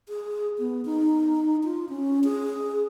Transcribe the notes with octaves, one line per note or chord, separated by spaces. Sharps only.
G#4
B3
D#4
F4
C#4
G#4